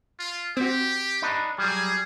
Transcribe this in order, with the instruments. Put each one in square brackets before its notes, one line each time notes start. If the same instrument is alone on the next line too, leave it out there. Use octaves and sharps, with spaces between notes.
[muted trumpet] F4
[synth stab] C4 F#4 [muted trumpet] G4
[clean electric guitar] D4 D#4 B4
[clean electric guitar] F#3 G3 [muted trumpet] G#4